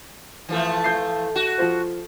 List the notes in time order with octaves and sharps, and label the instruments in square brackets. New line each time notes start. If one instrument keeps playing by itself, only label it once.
[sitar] E3 F3 A3
[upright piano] G6 C7
[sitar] F#4
[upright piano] F3 F4 C5